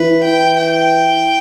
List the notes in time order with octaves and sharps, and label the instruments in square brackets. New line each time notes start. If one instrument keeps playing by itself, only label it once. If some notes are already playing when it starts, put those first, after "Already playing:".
Already playing: [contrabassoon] E3 [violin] B4
[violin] G5
G5